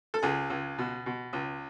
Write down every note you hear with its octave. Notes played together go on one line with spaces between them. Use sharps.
A4
C#2 G#4
C#2
B2
B2
C#2